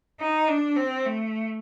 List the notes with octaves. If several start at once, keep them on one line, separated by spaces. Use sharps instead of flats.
D#4
D4
C4
A3